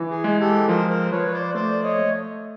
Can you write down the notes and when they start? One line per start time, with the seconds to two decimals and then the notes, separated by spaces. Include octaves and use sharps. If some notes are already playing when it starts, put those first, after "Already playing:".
Already playing: E3
0.11 G#4
0.24 G#3
0.39 G4 A4
0.68 F3 A#4 C5
0.89 A#4 C5
1.11 F3 B4 C#5
1.28 C#5
1.33 C5 D5
1.54 A3 C5 D5
1.83 C#5 D#5
1.98 A3